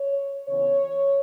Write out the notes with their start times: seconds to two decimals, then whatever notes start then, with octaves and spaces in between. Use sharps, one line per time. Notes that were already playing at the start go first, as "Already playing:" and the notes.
Already playing: C#5
0.47 C#3 E3 B3 C#5